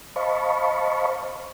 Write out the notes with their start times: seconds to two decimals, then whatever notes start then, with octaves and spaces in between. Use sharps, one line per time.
0.16 C5 D#5 F5 A5 B5 C#6